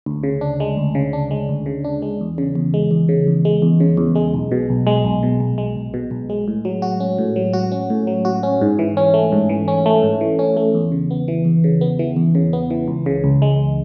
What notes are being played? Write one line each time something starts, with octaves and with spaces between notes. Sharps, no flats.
D2
C#3
D4
G#3
D2
C#3
D4
G#3
D2
C#3
D4
G#3
E2
C#3
E2
G#3
E2
C#3
E2
G#3
E2
C#3
E2
G#3
B1
B2
B1
G#3
B1
B2
B1
G#3
B1
B2
B1
G#3
A2
F#3
F#4
C#4
A2
F#3
F#4
C#4
A2
F#3
F#4
C#4
G#2
E3
C#4
A3
G#2
E3
C#4
A3
G#2
E3
C#4
A3
E2
C#3
B3
E3
E2
C#3
B3
E3
E2
C#3
B3
E3
C#2
C#3
C#2
G#3